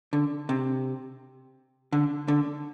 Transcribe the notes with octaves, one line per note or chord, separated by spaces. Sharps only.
D3
C3
D3
D3